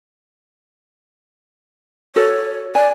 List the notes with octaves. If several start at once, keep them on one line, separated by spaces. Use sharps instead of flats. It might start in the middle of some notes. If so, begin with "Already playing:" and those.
F#4 A4 C#5 D5
D5 G#5